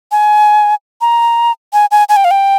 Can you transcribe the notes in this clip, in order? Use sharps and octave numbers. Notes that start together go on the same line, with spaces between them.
G#5
A#5
G#5
G#5
G#5
G5
F5
G5